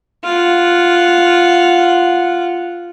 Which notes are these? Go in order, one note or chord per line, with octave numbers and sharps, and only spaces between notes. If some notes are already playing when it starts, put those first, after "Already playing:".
F4 F#5